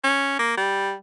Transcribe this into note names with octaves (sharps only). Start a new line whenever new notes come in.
C#4
A#3
G3